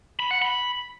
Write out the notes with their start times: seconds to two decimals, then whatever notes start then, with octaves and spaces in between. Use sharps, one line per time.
0.20 B5
0.31 F#5
0.42 B5